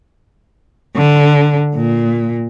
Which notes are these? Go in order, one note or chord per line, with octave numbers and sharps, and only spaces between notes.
D3
A#2